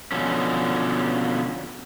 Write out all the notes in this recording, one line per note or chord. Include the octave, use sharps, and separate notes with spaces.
B2 D3 F3 C#4